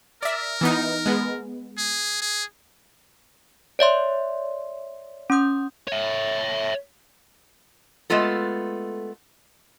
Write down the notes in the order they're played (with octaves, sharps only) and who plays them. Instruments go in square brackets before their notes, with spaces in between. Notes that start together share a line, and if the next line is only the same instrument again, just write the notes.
[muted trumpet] A#4 [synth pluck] D5 E5
[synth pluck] E3 B3 D#4
G#3 B3
[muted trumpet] G#4
G#4
[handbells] C#5 D5 E5 C6
C#4 C6 D#6 G6
[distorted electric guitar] C#5 E5
[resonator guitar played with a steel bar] G#3 A3 B3 F4 A4